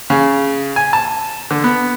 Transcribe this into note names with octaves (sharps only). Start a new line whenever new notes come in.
C#3
G#5
A5
D3
B3